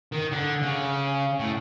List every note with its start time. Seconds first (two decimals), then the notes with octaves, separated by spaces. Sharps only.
0.12 D#3
0.32 D3
0.62 C#3
1.40 A2